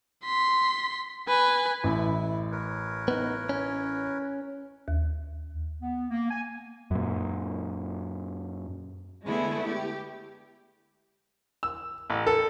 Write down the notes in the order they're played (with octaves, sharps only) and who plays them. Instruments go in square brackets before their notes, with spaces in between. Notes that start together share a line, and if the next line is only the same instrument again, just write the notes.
[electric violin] C6 B6
B4 G#5
[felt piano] A1 [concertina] E4
[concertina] A#4 B4 C#5
[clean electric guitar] B3 D#4
C#4
[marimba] D#2
[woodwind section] B3
A#3
G#5
[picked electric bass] F#2 A#2
[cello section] D3 G#3 A3 B3 E4 G#4
G4
[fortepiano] E6
A1
A4